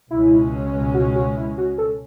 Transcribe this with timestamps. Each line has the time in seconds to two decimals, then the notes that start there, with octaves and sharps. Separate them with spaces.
0.10 C#2 B2 G#3 C#4 E4
0.94 F#4
1.15 F#4
1.37 E4
1.58 F#4
1.78 A4